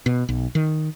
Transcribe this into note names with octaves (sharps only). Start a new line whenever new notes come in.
B2
B1
D#3